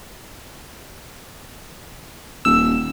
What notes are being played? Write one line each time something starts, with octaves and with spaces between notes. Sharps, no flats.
D#1 E6